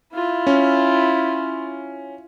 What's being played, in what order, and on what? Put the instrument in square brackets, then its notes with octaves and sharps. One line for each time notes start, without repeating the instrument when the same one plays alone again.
[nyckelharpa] E4 F4
[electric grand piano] C#4